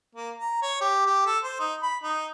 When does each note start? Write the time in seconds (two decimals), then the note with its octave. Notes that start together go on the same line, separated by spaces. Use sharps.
0.15 A#3
0.39 A#5
0.62 C#5
0.81 G4
1.06 G4
1.26 A4
1.44 C5
1.60 D#4
1.83 B5
2.04 D#4